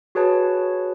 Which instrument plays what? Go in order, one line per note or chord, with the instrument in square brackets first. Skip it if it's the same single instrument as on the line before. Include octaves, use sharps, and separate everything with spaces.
[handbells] F#4 G#4 B4 C#5 A5